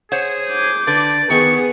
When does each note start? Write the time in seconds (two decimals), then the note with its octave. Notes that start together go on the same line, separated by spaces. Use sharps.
0.12 G#4 C5 C#5 F#5
0.49 D6 G6
0.87 D3 B4 D5
1.30 D#3 B3 G#4 C#6